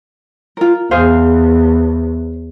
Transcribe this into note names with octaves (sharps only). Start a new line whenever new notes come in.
F4 A#4
E2 G#4 C5 F5